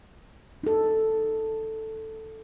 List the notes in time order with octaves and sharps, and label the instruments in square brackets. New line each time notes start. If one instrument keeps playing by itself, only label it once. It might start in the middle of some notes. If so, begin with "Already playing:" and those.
[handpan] D#4 A4